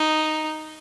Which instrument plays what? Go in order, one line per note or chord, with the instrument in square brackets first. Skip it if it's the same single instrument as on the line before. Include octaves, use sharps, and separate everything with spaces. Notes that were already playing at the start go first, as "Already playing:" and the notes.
Already playing: [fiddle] D#4